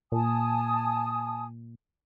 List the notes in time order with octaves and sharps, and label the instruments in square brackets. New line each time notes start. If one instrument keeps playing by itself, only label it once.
[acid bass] A#2 [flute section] G#5 A5 D#6